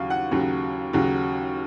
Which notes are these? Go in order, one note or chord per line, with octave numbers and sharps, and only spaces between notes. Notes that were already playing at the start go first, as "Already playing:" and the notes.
Already playing: D#2 C#3 F#3 F5
F#5
D#2 C#3 F#3
D#2 C#3 F#3